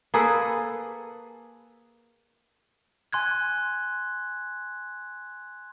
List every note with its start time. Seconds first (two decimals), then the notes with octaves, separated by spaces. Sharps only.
0.14 A#3 G#4 A4 B4
3.13 G#5 C6 F#6 G#6